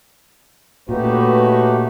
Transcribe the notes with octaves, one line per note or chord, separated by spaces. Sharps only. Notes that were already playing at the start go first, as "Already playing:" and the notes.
A#2 A3 C#4 D#4 F#4 G4 B4